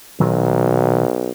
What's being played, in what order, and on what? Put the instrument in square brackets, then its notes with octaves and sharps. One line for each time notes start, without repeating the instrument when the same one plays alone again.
[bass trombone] B1 [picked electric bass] A#2 D#3 F#3